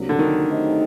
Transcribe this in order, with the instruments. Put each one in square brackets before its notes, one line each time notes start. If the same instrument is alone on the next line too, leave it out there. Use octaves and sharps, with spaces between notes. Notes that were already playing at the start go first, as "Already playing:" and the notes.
Already playing: [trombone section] C2 C3 F#3 A#3 D4
[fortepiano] D3
D#3
[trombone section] F#3 A3 C4 D#4 G4